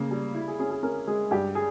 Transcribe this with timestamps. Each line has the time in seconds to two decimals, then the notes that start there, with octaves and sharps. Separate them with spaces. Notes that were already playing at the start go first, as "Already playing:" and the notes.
Already playing: C#3 A#3
0.11 G3
0.35 E4
0.48 G#4
0.59 C#4 G#4
0.71 G#4
0.83 C#4 A#4
1.07 G#3 G#4
1.31 G2 G4
1.55 G#4